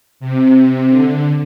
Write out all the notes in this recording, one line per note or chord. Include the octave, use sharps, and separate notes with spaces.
C3
D3